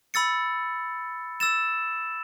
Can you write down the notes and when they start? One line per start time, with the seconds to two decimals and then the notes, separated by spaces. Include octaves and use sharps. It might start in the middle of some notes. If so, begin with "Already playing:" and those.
0.14 B5 E6 A6 C#7
1.40 E6 A6 E7